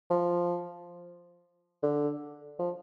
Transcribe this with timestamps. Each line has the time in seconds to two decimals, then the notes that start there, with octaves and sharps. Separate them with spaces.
0.10 F3
1.83 D3
2.59 F3